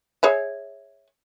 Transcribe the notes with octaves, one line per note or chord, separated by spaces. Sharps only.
G#4 C#5 E5